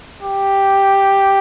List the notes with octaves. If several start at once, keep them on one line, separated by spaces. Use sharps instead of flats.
G4